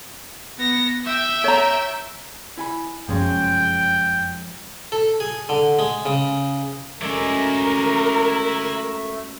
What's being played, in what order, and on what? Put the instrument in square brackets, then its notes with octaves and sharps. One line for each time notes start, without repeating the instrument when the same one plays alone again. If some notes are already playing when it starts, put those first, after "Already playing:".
[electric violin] B3 A#6
E5 G5
[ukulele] C#5 A#5
[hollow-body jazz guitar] E4 G#5 B5
[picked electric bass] F1 F#2 [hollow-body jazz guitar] F3 G#3 C#4 [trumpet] G5
[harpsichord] A4
G#4
D3
G#3
C#3
[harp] F#3 G#3 C#4 [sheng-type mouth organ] A3 E5 [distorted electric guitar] E4 D5 [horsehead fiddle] A#4